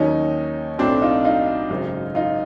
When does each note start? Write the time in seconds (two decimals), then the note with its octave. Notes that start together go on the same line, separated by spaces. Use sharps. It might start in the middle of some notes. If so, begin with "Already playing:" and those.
Already playing: D#2 D#3 F#3 C#4 D#4
0.79 B1 A2 F#3 C4 D4
1.02 D#4 F4
1.24 D#4 F4
1.70 G#1 F#2 C#3
2.15 D#4 F4